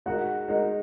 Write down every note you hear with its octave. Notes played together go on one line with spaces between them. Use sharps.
G#3 D#4 F#4 A#4 F#5
G#3 D#4 F#4 A#4